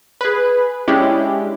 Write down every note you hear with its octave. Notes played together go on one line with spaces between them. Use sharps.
G#4 B4
G#3 C#4 D4 E4 G4